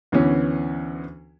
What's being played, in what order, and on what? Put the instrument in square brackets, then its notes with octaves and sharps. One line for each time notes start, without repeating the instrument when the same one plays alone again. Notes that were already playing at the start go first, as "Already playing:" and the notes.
[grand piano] D2 E3 B3 C#4